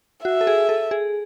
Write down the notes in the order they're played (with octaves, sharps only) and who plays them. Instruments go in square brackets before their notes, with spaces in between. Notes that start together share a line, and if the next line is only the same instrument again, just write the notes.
[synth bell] F#4 [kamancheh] E5
[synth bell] A4
G#4
A4
G#4